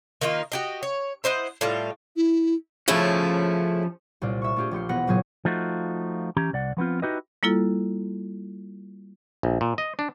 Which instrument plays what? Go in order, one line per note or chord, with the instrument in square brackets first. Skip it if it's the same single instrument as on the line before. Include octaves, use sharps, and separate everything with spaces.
[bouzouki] D#3 A#3 D#4 F4
F#4 G4 D#5
C#5
E4 C5 D#5 F#5
A2 G3 F4
[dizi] E4
[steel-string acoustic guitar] C#3 A3 E4 [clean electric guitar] F3 C#4
[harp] C2 A#2 F4 D5
E5 C#6
A3 D4 F4 G4 G#4
A#1 G4 C6 C#7
E1 B3 F#5 A#6 B6
F#1 A#2 F#3 C4 G#4
[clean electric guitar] F3 A3 D#4 F4 F#4
E3 C#4 G4 A#5
C2 D5 F#5
F3 B3 C4 F4
D#4 E4 F#4 G4 B4 D#5
[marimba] G3 A#3 E4 F4 A4
[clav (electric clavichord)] A#1
A#2
D#5
D4